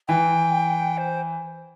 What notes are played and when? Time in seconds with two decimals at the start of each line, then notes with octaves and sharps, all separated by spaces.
0.08 E3 G5
0.97 C5